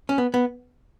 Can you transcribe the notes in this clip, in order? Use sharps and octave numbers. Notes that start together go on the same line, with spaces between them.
C#4
B3
B3